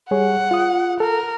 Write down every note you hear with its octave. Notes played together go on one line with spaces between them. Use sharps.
G3 G#4 C#5 F#5
F4 D#6
A4 A#4